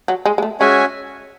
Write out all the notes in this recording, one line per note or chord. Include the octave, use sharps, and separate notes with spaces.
F#3
G#3
G#3
A3
G#3 C#4 F#4 C#5 E5 G#5